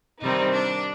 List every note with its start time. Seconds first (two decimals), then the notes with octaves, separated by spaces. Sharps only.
0.22 C3 D#3 G3 C4 D#4
0.52 D4